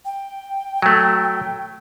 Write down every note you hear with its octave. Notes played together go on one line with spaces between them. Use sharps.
G5
F#3 A3